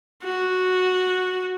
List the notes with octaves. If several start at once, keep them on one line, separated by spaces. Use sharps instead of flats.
F#4